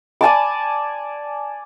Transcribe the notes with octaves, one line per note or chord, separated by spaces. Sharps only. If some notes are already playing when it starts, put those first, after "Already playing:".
D5 G#5 A5 D6